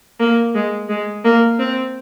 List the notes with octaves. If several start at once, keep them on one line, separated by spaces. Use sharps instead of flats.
A#3
G#3
G#3
A#3
C4